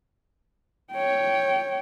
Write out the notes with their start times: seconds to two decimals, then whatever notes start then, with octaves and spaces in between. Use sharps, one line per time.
0.94 C#5 G5